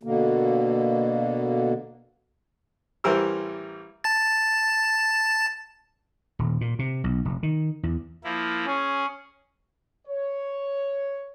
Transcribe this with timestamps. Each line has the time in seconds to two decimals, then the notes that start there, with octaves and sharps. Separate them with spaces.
0.03 B2 D3 A#3
3.04 A1 E3 G3 A#4 C5 E6
4.04 A5 A6
6.39 D#1
6.61 A#2
6.79 C3
7.04 B1
7.25 F1
7.43 D#3
7.83 E2
8.24 F3 A#3 E4
8.67 C#4 G#4
10.08 C#5